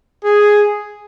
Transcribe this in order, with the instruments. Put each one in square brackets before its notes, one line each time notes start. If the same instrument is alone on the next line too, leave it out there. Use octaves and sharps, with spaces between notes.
[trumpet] G#4